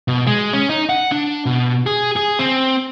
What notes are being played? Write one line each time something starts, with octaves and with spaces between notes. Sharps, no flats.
B2
G#3
C#4
D#4
F#5
D4
B2
G#4
G#4
C4